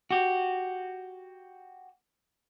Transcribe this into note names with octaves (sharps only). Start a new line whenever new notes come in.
F#4 G4